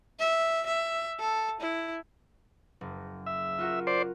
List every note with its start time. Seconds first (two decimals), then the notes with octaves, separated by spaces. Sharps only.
0.19 E5
0.66 E5
1.19 A4
1.61 E4
2.81 F#1
3.26 E5
3.59 F4 F#4 A#4
3.87 C5 D5